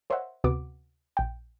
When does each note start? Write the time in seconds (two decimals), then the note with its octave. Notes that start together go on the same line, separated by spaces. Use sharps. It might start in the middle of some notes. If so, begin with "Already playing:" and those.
0.10 A#4 C5 C#5 D#5 E5 F#5
0.44 D2 C3 B3 F#4 D6
1.17 A#1 G5